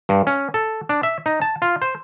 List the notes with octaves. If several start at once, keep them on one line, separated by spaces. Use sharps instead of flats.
G2
C#4
A4
D4
E5
D#4
A5
F4
C5